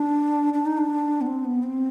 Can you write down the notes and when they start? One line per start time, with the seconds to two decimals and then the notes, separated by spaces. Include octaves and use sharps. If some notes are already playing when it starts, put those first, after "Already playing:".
Already playing: D4
0.53 D4
0.66 D#4
0.78 D4
1.21 B3
1.26 C4
1.45 B3
1.63 C4